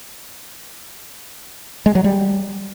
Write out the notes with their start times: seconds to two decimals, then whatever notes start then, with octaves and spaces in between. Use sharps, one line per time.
1.86 G#3
1.95 F#3
2.04 G3